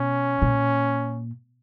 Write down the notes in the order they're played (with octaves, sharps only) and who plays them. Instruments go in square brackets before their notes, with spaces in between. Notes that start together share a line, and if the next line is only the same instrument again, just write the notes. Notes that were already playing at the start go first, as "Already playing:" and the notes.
Already playing: [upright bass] B2 [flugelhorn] C#4
[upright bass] A#2